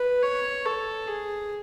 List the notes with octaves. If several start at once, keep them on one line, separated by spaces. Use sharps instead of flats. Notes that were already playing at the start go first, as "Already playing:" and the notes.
Already playing: B4
C#5
A4
G#4